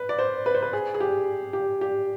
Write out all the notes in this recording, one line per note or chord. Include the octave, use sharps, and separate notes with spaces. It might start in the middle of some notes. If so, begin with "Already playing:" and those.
Already playing: B4
D5
C5
B4
C5
B4
G#4
G#4
G4
G4
G4